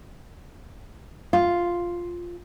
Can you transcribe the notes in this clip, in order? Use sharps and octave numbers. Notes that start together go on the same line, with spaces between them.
F4